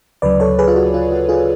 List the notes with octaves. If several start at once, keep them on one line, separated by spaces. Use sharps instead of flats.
D2 C#3 F#3 B4 D5
A4 C#5
G#4 B4
F4
F#4
F4
F#4
F4 G#4